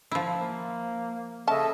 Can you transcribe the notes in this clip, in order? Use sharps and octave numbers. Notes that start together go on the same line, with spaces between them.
F3 E4
A#3
C#3 C#4 A4 D#5 E5 A5